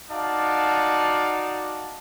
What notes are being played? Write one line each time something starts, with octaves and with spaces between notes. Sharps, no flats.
D#4 F#4 D5 F5 A5